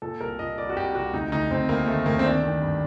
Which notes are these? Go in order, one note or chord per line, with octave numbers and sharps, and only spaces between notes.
A#2 A4
C2 A#4
A#2 D#5
C2 D5
F#4
C2 G4
C2 F#4
D2 D#4
D2 D#4
D2 C4
D2 A#3
D#3 A3
D2 A#3
C4
D#3 D4
D#3
G2